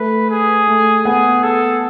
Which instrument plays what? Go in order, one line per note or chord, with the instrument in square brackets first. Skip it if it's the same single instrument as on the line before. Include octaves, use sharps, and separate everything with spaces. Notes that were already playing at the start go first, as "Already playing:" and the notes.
Already playing: [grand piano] A3 [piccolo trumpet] B4
[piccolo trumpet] G#4
[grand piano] A3
[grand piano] B3 [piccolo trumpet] G#4
[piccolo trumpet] A4